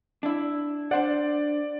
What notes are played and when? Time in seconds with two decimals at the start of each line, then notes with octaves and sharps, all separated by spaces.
0.23 D4 E4
0.91 D4 C5 D5 F#5